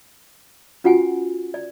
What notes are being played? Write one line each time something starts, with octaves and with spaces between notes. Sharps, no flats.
C#4 F4 F#4 F#5 G#5
D5